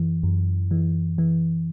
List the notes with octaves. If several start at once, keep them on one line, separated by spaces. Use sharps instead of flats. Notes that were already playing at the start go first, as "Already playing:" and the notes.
Already playing: F#2 E3
F#2
E3
E3